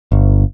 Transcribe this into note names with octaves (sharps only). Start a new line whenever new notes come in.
G1